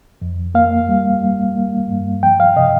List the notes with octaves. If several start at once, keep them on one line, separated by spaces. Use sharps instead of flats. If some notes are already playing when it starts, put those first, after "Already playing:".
F2
A#3 F5
G3
G3
A#3
G2
F3 G5
F5
C3 D#5